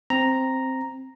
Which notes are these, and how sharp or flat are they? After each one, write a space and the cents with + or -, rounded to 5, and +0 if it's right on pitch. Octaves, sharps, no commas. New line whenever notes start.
C4 +0 A#5 +0